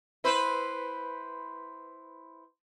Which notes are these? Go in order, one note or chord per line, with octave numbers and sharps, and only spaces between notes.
E4 B4 C5